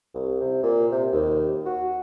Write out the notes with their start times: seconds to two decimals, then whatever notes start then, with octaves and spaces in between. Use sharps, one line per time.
0.14 C2
0.40 C3
0.63 A#2
0.92 C3
1.12 D#2
1.65 F#4